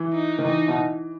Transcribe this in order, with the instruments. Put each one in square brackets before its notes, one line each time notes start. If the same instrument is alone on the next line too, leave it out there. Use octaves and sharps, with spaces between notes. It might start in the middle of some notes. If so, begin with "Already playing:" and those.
Already playing: [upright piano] E3
[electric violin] D#4
[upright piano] D#3
[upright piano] E3 [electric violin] D#4
[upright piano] B2